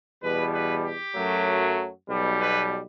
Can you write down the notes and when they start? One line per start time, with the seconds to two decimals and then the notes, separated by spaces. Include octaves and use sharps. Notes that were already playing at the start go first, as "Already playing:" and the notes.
0.22 E2 B2 G3 B4
0.52 B4
0.83 G4
1.15 F#2 F#3 A3
2.08 B1 B2 G3
2.38 B4